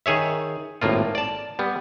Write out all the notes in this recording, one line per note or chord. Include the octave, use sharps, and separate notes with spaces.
D#3 G#4 C#5 E5
G#1 A2 A#3 F4
D5 A5
G3 B3